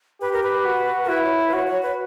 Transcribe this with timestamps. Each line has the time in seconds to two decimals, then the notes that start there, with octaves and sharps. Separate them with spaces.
0.21 G4 B4
0.33 A#4
0.43 B4
0.65 F#4
1.04 A#4
1.09 E4 B4
1.24 C#5
1.39 E5
1.48 B4
1.53 F#4 C#5
1.67 C#5
1.82 B4